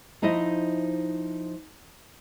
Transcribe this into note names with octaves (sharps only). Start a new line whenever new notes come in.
F3 D#4 E4 C5 D#5